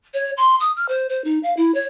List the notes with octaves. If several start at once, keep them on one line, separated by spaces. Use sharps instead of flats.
C#5
C6
D#6
F6
C5
C5
D#4
F5
E4
C#5